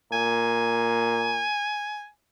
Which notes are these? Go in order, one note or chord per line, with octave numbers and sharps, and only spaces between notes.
A#2 G#5